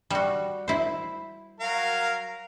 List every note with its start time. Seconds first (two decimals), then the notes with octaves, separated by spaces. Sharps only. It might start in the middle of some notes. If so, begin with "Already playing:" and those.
0.10 G3 F#4
0.68 E4 C5
1.60 F#3 A#4 F5